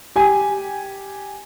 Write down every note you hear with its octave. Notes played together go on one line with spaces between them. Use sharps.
G4 G#5